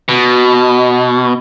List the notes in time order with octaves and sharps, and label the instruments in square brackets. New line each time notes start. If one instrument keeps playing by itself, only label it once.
[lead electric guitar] B2